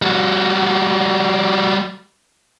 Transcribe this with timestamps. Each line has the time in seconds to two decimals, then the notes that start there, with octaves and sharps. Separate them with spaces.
0.02 G3 F#4